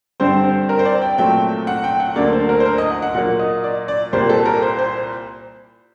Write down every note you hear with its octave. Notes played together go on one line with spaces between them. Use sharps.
G2 D3 G3 C4 C5
C5
A#4
C5
D5
G5
A#2 F#3 A3 C4 G5
F#5
G5
F#5
D2 D3 F#3 A#3 D5
C5
A#4
C5
A#4
D#5
F#5
F#5
A#2 F#3 A#3 F#5
D#5
D5
D5
C2 A#2 G3 A#3 C5
A4
A#4
C5
C5